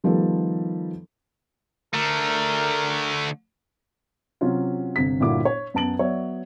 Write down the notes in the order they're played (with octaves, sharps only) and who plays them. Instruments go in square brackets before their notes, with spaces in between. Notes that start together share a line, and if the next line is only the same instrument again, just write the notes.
[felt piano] D#3 F3 G3 A3 B3 A4
[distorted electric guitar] D3 A3 [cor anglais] A#4
[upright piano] C3 F#3 C#4 F4
G1 C3 B6
G1 A#2 E4 F#4 D6
C#5
F#2 B3 A5 D7 F#7
F#3 B3 C#5 D5 E5